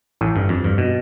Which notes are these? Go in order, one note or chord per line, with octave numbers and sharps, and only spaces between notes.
A1 A2
G2
F2
G2
B2